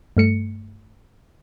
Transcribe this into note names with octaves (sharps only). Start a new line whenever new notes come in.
G2 A3 C#7